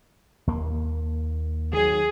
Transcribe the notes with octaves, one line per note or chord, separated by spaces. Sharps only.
D#2 A#3
D#3 F#3 G#4